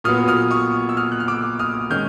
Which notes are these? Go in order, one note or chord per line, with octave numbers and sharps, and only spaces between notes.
A#2 F#3 B3 D#6 F6
D#6 F6
C#6 D#6
E6
D#6 F6
F#6
F6
D6 E6
D#6 F6
D#3 G#3 C#4 F6 G6